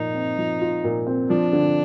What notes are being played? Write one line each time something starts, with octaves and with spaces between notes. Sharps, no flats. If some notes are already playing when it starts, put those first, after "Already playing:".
Already playing: A#2 F3 D#4 F4
C4
F3
F4
A#2
C4
F3 D4
D3